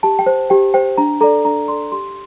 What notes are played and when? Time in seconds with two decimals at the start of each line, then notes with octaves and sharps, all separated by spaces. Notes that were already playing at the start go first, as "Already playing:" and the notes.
0.03 G4 A5
0.19 G5
0.26 C5
0.50 G4 G5
0.74 C5 G5
0.97 D4 A#5
1.21 A4 D5 A#5
1.45 D4 A#5
1.68 D5 C6
1.72 A4
1.92 G4 C6